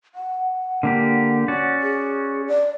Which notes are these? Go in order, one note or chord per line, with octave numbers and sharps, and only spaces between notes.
F#5
D3 A#3 G4
C#4 F#4 D5
G#4
D5